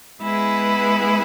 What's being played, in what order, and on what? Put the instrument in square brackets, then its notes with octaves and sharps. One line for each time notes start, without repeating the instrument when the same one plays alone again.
[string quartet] G#3 B3 E4 G#4 B4